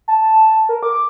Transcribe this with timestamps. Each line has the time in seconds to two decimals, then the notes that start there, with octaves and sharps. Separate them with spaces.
0.08 A5
0.69 A#4
0.83 D6